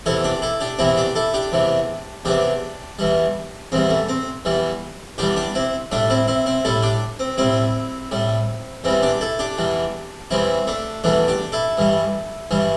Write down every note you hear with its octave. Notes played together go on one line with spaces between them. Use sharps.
E2 C3 E3 E4 A4
D4 G4
E4 A4
D4 G4
E2 C3 E3 C4 E4
D4 G4
E4 A4
D4 G4
E2 C3 E3
E2 C3 E3 D4 G4
E2 E3 G3
E2 E3 G3 C4
A3
C4
E2 E3 G3
E2 E3 G3 D4 G4
D4 G4
C4 E4
A2 G3 A3 D4
C4 E4
C4 E4
C4 E4
A2 G3 E4 A4
D4 G4
C4
A2 G3 C4 E4
A2 G3
E2 E3 G3 C4
D4 G4
E4 A4
D4 G4
E2 E3 G3
E2 E3 G3 C4 E4
A3 D4
E2 E3 G3 A3 D4
D4 G4
E4 A4
G2 E3 G3
G2 E3 G3